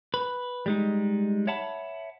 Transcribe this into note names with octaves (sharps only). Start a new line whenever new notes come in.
B4
G3 G#3 D#4
C#5 E5 F#5 A5 B5